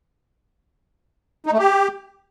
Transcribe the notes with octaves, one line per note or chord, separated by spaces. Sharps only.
D#4
A3
G4